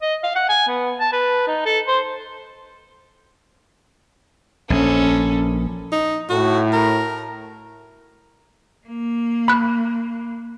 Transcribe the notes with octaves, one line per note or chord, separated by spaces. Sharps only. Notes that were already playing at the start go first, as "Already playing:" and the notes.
D#5
F5
F#5
G#5
B3
A5
B4
D#4
A4
C5
A#1 C#4 A4
D#4
A2 F#4
A#4
A#3
B5 F#6